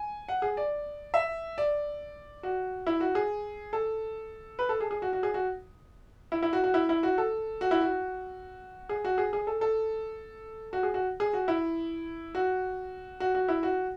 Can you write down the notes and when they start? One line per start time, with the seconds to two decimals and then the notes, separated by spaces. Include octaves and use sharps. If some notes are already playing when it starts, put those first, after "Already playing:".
Already playing: G#5
0.29 F#5
0.42 G#4
0.57 D5
1.14 E5
1.58 D5
2.43 F#4
2.87 E4
3.00 F#4
3.15 G#4
3.73 A4
4.59 B4
4.69 A4
4.80 G#4
4.91 G#4
5.02 F#4
5.13 F#4
5.23 G#4
5.34 F#4
6.32 E4
6.43 E4
6.53 F#4
6.64 F#4
6.74 E4
6.89 E4
7.03 F#4
7.18 A4
7.61 F#4
7.71 E4
7.81 F#4
8.89 G#4
9.05 F#4
9.18 G#4
9.33 G#4
9.47 A4
9.61 A4
10.73 F#4
10.83 G#4
10.94 F#4
11.20 G#4
11.33 F#4
11.48 E4
12.35 F#4
13.20 F#4
13.35 F#4
13.48 E4
13.63 F#4